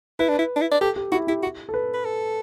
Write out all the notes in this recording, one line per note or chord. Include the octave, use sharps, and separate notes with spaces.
E4 B4
D4
E4
D4
E4
D5
G4 A4
G4
E4 F#4
E4 G4
F#4
A4
B4
B4
A4